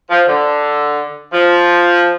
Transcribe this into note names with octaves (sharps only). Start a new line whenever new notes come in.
F3
D3
F3